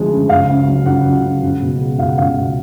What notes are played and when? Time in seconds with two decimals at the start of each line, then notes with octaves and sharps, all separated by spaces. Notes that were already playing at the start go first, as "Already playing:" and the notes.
Already playing: D2 F3 G#3
0.11 C#3
0.29 C#2 F5
0.49 C#3
0.68 F#3
0.86 C#2 F#5
1.05 C#2
1.24 C#3
1.42 C#2
1.61 B2
1.80 G#3
1.99 C#2 F5
2.09 F#5
2.18 C#2 F5
2.37 B2